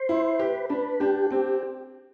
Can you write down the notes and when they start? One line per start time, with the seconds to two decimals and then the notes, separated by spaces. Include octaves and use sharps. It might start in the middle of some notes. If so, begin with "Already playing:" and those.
Already playing: C5
0.09 E4
0.39 G4 B4
0.70 D4 B4
1.00 D4 G4
1.31 C4 G4